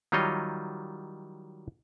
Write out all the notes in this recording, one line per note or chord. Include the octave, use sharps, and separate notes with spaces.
D#3 F#3 G3 F4 C#5 D#5